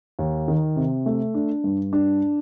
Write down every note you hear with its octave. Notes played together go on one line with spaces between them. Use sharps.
D#2
D#3
C3
A3
D4
G2
D4